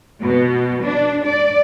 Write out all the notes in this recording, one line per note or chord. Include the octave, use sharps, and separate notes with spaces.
B2
D4
D5